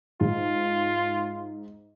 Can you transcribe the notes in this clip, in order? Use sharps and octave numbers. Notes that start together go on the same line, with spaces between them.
G#2 F4